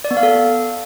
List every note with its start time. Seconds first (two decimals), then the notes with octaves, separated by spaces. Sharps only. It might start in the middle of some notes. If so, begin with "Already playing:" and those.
0.05 D5
0.11 B3
0.17 F5
0.23 A4